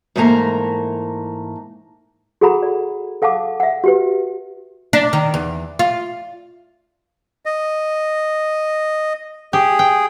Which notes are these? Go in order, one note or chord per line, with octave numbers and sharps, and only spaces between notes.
G#2 E3 A3 A#3 A#5
F#4 G#4 A4 F#5 A#5 B5
D5
A4 F5 F#5 A5 D6
E5 F#5
F#4 G4 B4
D4
D#3
E2
F4
D#5
G4 G#4
G5